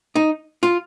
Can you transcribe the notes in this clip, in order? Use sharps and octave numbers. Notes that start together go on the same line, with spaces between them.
D#4
F4